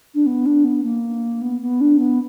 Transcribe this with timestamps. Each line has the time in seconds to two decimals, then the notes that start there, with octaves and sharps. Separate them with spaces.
0.14 D4
0.26 B3
0.46 D4
0.65 B3
0.83 A#3
1.42 B3
1.61 B3
1.81 D4
1.99 B3